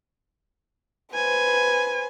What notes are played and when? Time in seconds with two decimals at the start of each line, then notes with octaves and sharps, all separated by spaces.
1.14 B4 C5 G#5